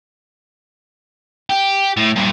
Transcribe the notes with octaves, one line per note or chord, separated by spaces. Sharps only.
G4
A2
G2 A#2